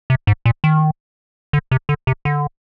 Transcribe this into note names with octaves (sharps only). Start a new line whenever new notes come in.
C3
G#2
A#2
D#3
D3
C3
D3
C3
D3